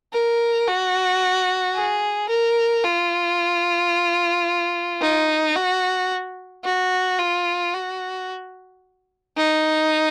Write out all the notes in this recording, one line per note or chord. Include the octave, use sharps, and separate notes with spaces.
A#4
F#4
G#4
A#4
F4
D#4
F#4
F#4
F4
F#4
D#4